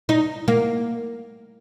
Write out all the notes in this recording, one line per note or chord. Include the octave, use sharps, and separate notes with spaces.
D#4
A#3